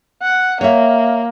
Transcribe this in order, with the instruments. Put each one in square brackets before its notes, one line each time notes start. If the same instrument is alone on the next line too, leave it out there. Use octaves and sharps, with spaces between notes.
[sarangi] F#5
[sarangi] A#3 [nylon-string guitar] C#5 E5